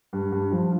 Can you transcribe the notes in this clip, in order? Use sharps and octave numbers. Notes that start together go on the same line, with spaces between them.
G2
G2
F3